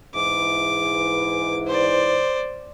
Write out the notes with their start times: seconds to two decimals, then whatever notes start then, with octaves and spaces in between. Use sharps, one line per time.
0.14 G#2 E3 D6
1.67 C5 D5